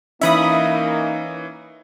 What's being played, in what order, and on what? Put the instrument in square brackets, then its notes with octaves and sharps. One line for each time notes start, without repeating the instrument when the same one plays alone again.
[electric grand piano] E3 C#4 [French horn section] A#3 D#4 [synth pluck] E5 B5 D#6